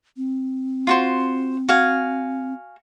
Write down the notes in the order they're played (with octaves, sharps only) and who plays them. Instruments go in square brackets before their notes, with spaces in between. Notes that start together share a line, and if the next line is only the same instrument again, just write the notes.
[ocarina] C4
[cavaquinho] F4 F#4 C5
F#4 F5 G#5